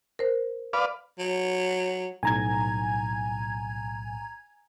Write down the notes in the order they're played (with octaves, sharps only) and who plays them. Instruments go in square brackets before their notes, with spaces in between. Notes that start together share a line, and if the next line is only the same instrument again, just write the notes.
[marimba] A#4 C5
[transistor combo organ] B4 D5 F5
[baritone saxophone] F#3
[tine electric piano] B1 A2 [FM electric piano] G#5 A#5 G#6